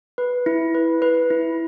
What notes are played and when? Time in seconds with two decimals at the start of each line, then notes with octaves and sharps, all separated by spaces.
0.18 B4
0.46 E4
0.75 B4
1.02 B4
1.30 E4